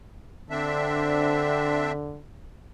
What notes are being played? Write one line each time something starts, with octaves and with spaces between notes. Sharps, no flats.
D3 C4 D4 E5